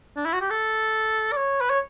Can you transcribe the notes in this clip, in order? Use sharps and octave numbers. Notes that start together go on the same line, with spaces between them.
D4
E4
F#4
G4
A4
D5
C#5
B4
C#5